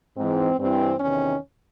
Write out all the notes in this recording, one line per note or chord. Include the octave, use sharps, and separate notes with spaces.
G#2 E3 C4
G2 E3 C4
E2 C3 D#3 C#4